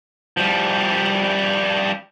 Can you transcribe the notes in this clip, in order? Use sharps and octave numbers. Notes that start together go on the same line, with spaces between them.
F3 G3